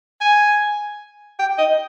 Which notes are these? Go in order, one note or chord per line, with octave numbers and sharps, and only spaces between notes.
G#5
G5
D#5